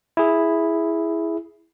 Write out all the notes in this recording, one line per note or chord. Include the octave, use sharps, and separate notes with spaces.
E4 G#4